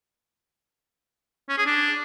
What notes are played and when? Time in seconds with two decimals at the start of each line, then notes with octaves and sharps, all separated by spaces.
1.49 C#4
1.58 G#4
1.66 D4